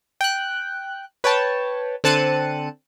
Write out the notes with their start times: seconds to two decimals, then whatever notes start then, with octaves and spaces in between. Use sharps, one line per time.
0.21 G5 F#6
1.24 B4 C#5 G5 A5
2.04 D3 C4 A5 F#6 C#7 D#7